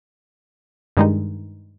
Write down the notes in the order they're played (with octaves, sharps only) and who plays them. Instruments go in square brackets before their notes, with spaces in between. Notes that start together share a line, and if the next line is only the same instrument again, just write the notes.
[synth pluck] G2 D#3 G#3 D#4